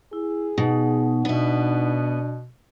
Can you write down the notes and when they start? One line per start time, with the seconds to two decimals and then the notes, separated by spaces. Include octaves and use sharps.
0.13 E4 G#4
0.58 B2 D#4 F#5
1.25 B2 B3 D4 E5